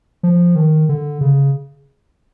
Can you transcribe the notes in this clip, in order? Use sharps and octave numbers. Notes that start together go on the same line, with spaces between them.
F3
D#3
D3
C#3